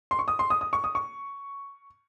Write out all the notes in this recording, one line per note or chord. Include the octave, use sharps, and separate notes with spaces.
C6
C#6
D#6
C6
D#6
D#6
C#6
D#6
C#6